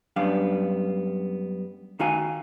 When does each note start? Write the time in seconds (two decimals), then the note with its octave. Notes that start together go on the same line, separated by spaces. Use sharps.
0.16 F#2 G3 B3 D4 F5
1.99 D#3 D#4 F#4 F5 G#5